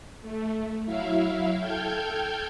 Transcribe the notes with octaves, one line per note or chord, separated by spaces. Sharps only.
A3
F#3 E4 E5 F5
A4 G5 F6 G6 G#6